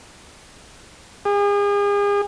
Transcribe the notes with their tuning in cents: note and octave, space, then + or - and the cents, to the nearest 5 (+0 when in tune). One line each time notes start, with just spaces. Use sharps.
G#4 -40